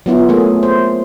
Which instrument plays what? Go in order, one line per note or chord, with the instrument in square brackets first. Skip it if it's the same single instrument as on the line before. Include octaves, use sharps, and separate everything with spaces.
[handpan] F#3 B3 E4 F4
A3 A#3 G#4
C5